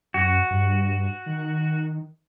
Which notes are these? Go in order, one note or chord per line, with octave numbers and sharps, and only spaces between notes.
F#2 F#4
G2
D#3